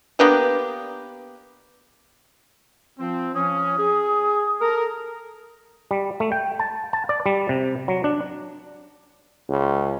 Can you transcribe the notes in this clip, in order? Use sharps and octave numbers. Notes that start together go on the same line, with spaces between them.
A#3 B3 D4 G4
F3 C4
F3 C#4 D#6
G#4
A4 A#4
G3
A3
G5
A5
A5
D5
G3
C3
F#3
D4
C#2